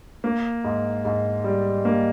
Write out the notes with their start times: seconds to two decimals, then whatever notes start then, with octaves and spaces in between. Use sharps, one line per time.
0.24 A#3
0.64 G#2
1.05 G#2
1.44 G3
1.85 A#3